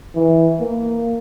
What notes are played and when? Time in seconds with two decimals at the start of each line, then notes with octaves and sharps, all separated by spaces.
0.15 E3
0.61 A#3